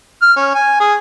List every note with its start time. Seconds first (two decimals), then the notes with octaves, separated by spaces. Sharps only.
0.22 F6
0.36 C#4
0.55 G#5
0.80 G#4